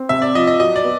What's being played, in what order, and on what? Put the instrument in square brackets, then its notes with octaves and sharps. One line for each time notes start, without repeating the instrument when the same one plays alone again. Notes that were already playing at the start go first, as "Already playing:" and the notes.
Already playing: [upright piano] C4
[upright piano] C3 [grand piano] E5
[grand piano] D5
[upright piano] F3 [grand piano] D#5
[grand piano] D#5
[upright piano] F#3 [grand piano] D#5
[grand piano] D5
[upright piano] B3